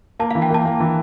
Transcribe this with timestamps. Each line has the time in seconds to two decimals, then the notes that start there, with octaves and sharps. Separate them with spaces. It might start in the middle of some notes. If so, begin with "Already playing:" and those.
0.19 A#3 A5
0.31 F5
0.35 E3
0.42 G5
0.50 A#3 A5
0.65 A#3
0.80 E3